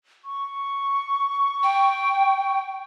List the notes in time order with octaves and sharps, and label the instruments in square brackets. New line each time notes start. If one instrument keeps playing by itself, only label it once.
[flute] C#6
[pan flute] G5